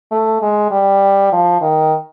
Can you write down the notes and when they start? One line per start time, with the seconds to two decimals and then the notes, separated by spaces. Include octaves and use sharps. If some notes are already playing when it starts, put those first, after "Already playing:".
0.11 A3
0.42 G#3
0.71 G3
1.32 F3
1.61 D#3